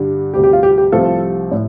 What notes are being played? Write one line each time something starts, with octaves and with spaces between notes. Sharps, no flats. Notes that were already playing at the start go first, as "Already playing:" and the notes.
Already playing: G2 D3 G3
D2 C3 G3 G4
G4
F4
G4
G4
C2 C3 F3 A3 F4 A4
A2